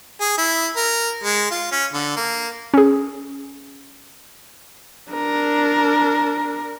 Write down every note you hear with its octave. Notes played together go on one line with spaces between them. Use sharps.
G#4
E4
A#4
G#3
F4
C#4
D3
A#3
C#4 G#4
D4 A#4